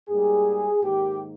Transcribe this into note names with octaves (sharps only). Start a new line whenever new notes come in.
G#2 G3 A#3 G#4
G#2 D#3 A#3 G4